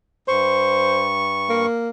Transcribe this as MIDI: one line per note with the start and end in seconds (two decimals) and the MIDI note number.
0.28 1.66 43
0.28 1.07 72
0.28 1.66 85
1.49 1.89 58